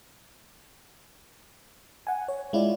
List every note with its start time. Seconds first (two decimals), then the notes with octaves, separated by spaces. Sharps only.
2.07 F#5 G#5
2.28 C#5
2.53 G#3 E4 F4 D5